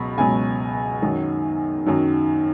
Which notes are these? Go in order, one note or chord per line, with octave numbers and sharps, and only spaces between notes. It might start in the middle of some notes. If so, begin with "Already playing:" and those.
Already playing: C#2 B2 F#3 B5 C#6
C#2 B2 F#3 G#5
F#2 D#3 F#3
F#2 D#3 F#3